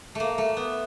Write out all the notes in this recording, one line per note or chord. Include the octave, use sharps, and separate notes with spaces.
A3 A#3
A3
B3